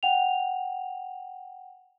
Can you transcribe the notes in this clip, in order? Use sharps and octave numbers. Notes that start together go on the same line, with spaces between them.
F#5 G5 F7